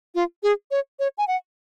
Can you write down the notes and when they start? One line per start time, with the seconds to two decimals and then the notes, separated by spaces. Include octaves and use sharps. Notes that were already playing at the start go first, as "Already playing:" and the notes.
0.15 F4
0.43 G#4
0.71 C#5
0.99 C#5
1.18 G#5
1.28 F#5